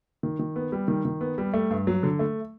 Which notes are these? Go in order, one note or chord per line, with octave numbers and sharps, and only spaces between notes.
D#3
D#3
B3
G3
D#3
D#3
B3
G3
A3
G2
F#3
D3
A3